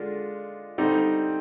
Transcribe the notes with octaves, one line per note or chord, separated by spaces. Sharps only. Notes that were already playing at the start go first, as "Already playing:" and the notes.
Already playing: D3 G#3 D4 F4
D3 G3 C4 D#4